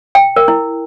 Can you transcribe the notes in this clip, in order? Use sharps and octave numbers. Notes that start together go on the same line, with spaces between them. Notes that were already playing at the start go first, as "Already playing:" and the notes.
G5
A#4
E4